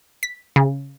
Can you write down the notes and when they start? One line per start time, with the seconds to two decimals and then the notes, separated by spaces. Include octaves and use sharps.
0.23 B6
0.56 C#3